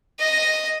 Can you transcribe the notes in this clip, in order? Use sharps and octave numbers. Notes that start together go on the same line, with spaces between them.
D#5